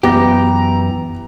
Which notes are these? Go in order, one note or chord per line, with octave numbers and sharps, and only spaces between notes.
F#2 E3 B3 G4 A#5 A#6